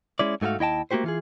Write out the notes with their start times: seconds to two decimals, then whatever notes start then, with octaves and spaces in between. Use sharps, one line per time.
0.19 G#3 C#4 E4 D5
0.42 G#2 A3 F#4 A#4 F5
0.59 D#2 E4 D#5 G5 A5
0.91 A3 A#3 D#4 F#4 G4 C5
1.04 E3 F4 G#4